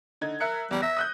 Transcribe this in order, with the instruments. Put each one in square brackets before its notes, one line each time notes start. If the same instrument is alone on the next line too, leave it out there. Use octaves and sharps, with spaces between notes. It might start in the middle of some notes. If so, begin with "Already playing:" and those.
[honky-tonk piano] D3 D#4 G#6
[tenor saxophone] A#4 [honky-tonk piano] E5 F#6 C#7
[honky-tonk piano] E2 [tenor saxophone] G3
[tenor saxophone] E5 [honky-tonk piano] A#6
[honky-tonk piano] D#6 F#6 G6